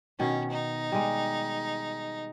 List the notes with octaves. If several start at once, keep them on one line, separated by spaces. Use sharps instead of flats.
B2 D#3 C#4
D#4
G3 G#3